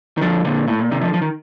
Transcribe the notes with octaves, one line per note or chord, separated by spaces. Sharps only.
D#3
D3 F3
A#2 D3
A2
A#2
C3 D#3
D3 F3
F3
D#3